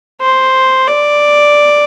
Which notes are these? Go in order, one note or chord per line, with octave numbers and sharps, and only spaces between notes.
C5
D5